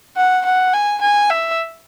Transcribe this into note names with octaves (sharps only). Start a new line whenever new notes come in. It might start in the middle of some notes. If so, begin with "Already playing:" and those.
F#5
F#5
G#5
G#5
E5